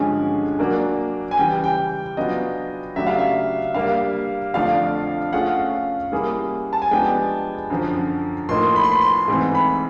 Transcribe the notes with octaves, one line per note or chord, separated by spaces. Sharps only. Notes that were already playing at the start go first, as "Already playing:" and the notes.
Already playing: G2 D3 F3 G#3 C#4 G#5
F#3 A#3 D4
G#5
C#3 E3 G3 G5
G5
F#3 B3 D4 F4 D#5
C#3 F#3 A3 D4 G4 E5
F5
E5
G3 A#3 D4 F5
F2 D3 F3 A3 D4 F5
A3 C#4 F4 G#4 F#5
G3 A#3 C#4 E4 G#4
A5
G#5
F3 G#3 B3 D4 G4 G5
F#2 D3 F3
A2 F3 A#3 D#4 C6
B5
C6
B5
C6
G#2 E3 A3 C4
B5